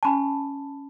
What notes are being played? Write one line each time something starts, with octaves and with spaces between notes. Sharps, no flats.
C#4 G#5 A5 B5